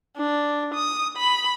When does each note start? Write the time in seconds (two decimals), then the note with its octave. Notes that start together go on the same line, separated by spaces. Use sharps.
0.17 D4
0.74 D#6
1.17 B5